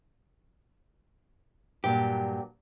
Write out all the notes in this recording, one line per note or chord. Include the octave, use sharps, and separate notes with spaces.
G2 A#2 F#3 G4